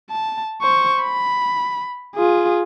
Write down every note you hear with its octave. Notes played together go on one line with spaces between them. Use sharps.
A5
C5 C#6
B5
F4 G#4